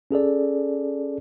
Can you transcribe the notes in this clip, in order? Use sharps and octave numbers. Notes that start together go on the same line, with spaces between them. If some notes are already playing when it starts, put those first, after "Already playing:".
C#4 G#4 A4 D5